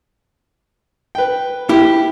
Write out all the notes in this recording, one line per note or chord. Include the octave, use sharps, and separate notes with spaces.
B4 G5
E4 G4